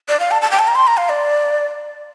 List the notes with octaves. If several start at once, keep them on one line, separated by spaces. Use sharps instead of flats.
D5
F5
A5
A5
G5
A5
A#5
C6
A#5
F5
D5